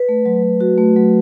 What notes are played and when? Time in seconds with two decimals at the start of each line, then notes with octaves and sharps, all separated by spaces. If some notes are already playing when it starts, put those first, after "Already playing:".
Already playing: B4
0.09 A3
0.25 F#3
0.43 F#3
0.60 F#4
0.78 A3
0.96 F#3